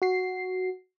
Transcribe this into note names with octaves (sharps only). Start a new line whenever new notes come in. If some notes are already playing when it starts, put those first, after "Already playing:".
F#4 C7